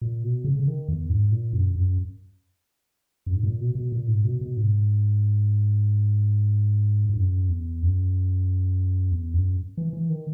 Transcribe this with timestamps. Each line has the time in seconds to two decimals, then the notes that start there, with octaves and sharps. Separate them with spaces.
0.01 A#2
0.23 B2
0.44 C#3
0.59 C#3
0.67 D#3
0.88 E2
1.09 G#2
1.32 A#2
1.53 F#2
1.76 F#2
3.26 F#2
3.36 G#2
3.43 A#2
3.60 B2
3.75 B2
3.92 A#2
4.08 G#2
4.25 B2
4.41 B2
4.57 G#2
7.09 G#2
7.16 F#2
7.49 E2
7.82 F#2
9.11 E2
9.34 F#2
9.77 E3
9.93 E3
10.10 D#3